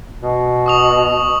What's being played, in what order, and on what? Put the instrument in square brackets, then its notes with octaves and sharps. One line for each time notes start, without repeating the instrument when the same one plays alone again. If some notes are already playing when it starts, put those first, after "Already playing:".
[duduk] B2
[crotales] C#6 D#6 F7